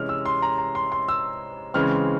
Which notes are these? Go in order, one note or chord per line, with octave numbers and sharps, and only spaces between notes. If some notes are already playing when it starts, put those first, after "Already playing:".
Already playing: C3 E3 G#3 C#4 F6
E6
C6
A#5
A#5
C6
C6
E6
C#3 E3 G#3 C4 F6